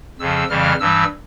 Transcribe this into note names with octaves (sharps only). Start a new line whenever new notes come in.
F2 C#3 F3 E6
F2 C#3 E3 G3 F6
G2 E3 G3 E6